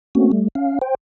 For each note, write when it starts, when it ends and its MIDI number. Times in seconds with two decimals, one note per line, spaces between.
0.15 0.31 57
0.15 0.31 58
0.15 0.31 60
0.15 0.31 61
0.15 0.31 66
0.32 0.48 55
0.32 0.48 57
0.55 0.79 61
0.55 0.79 77
0.82 0.95 72
0.82 0.95 79